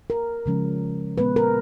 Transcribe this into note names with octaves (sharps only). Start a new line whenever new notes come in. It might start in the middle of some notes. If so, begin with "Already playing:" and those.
A#4
C#3 F3 G#3 C#4
A#2 G#3 B3 B4
A#4